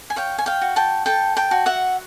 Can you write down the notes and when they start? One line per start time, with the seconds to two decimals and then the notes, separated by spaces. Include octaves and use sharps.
0.10 G#5
0.16 C#5 F5 G5
0.38 G#5
0.46 F5 G5
0.62 F#4
0.76 G5 A5
1.06 A4 G5 A5
1.37 G5 A5
1.51 F#4
1.66 E5 F#5